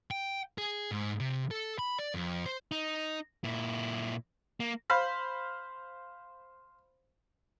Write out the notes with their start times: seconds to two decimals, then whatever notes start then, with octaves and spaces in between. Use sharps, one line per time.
0.11 G5
0.58 G#4
0.92 G#2
1.20 C3
1.51 A4
1.79 B5
1.99 D5
2.14 F2
2.46 C5
2.71 D#4
3.44 A#2 E4
4.60 A#3
4.90 C5 F5 B5